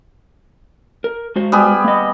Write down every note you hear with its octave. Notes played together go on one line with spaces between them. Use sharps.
A#4
G#3 F#4 C5
G3 B3 G#4
A#3 D#5